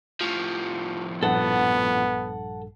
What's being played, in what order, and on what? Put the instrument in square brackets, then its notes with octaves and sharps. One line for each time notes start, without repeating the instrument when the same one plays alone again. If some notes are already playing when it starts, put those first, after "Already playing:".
[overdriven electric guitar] A2 F3
[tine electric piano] A#1 G2 [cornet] B3 [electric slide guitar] A4 F#5